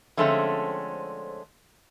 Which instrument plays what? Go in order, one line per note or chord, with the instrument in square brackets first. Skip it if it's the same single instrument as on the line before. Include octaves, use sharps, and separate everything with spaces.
[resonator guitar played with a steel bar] D3 F3 G#3 A3 C4 C#4